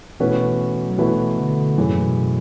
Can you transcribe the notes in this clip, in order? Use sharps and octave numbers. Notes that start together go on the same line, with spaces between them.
B2 E3 A3 C#4 E4 B4
F#3
B2 E3 A3 C#4 E4 B4
D3
F#2 B2 E3 A3 C#4 G#4
A2
B2